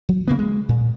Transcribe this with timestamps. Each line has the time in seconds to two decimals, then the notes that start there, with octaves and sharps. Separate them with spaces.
0.09 F#3
0.28 C#3 A#3 B3
0.39 G#3
0.69 A#2